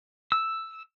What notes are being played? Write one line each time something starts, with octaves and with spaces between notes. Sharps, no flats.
E6